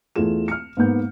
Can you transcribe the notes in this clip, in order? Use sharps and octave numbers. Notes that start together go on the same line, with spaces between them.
E2 A3 F4 G#4 E7
F6 C#7
G#2 A#3 B3 G6